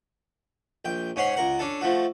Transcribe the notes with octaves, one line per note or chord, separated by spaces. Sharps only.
A#1 G5
G#2 C#4 C#5 F#5 C6
C#2 A#4 F#5
C#4 D4 A4
F3 A3 F#4